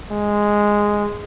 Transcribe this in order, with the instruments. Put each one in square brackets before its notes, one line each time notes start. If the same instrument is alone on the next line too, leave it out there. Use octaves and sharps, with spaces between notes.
[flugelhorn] G#3